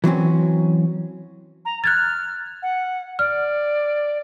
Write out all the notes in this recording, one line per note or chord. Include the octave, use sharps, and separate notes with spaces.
E3 F#3 C4 C#4
A#5
F6 F#6 G#6 A6
F#5
D5 F6